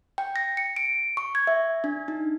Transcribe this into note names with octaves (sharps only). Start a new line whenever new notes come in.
G5
A#6
C#7
D7
C#6
G#6
E5
D4
D#4